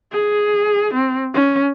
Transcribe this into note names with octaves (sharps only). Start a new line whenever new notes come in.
G#4
C4
C#4